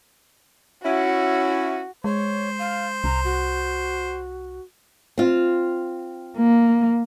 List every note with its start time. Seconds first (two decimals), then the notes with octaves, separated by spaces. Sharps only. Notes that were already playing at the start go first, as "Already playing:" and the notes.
0.85 C#4 E4 F#4
2.04 G#3 C5 C#5
2.59 F5
3.04 C2 A#5
3.24 F#4
5.18 C4 F4
6.37 A#3